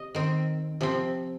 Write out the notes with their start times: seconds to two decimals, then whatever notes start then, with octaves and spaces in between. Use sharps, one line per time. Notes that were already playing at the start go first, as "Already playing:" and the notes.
Already playing: C3 D#5
0.15 D#3 C4
0.81 C3 F3 C4